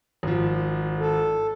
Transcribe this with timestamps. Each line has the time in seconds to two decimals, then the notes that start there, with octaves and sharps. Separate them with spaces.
0.23 G#1 F3
0.99 A4